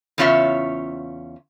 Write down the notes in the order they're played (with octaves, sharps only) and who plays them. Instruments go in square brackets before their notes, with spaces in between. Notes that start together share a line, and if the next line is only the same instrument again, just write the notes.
[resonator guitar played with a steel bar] E2 C#3 C#4 F4 C#5 E5